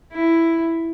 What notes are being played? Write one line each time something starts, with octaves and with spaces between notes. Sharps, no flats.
E4